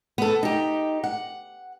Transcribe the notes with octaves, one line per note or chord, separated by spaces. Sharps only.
B3 A4
D#4 G4
F#5